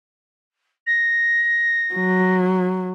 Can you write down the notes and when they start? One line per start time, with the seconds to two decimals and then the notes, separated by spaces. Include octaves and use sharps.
0.87 A#6
1.94 F#3